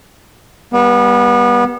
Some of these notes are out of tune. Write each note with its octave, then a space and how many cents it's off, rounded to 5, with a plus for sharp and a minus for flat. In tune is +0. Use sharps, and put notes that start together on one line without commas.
G3 +10 B3 -30